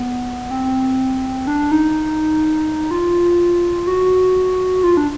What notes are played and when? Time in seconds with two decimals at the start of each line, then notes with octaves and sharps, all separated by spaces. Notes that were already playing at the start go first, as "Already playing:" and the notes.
Already playing: B3
0.51 C4
1.47 D4
1.72 D#4
2.91 F4
3.87 F#4
4.83 F4
4.97 D4